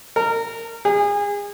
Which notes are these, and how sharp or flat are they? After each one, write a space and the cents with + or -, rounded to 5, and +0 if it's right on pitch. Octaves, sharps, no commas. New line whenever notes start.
A#4 -20
G#4 -30